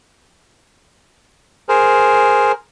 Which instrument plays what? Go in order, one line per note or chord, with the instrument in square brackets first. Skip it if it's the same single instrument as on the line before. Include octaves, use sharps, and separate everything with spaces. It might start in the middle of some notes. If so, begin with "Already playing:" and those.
[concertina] G#4 A#4 C5